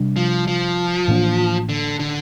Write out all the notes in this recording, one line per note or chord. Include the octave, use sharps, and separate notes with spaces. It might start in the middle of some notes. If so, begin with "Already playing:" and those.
Already playing: C3 G3 D4
F3
F3
A2 E3 A#3 D4
D3
D3